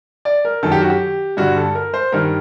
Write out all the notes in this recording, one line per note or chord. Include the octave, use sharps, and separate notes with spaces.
D5
A#4
F#2 D#3 A4
G4
F#4
G4
G2 D3 F#4
A4
A#4
C5
G2 D#3 A#4